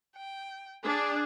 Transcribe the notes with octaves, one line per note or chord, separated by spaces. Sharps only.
G5
D4 G#4